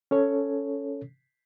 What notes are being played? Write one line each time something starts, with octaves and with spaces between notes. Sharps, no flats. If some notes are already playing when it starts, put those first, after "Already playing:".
C#4 A4 C#5